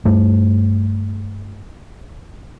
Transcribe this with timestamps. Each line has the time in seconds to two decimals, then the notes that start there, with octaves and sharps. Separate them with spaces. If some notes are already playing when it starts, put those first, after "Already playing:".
0.05 G2 A3